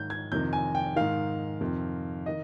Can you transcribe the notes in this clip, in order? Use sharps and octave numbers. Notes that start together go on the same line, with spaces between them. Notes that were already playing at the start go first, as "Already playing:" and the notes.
Already playing: G#2 D#3 G6
G#6
F2 C3 D#3 G6
G#5
G5
G#2 D#3 F5
F2 C3 D#3
D#3 D#5